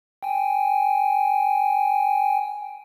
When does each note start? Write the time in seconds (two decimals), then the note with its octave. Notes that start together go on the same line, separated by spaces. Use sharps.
0.23 G5 G#5